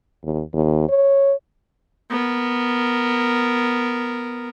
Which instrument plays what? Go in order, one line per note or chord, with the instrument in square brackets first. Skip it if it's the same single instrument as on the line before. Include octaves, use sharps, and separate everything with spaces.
[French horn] D#2
D#2
C#5
[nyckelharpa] B3 A#4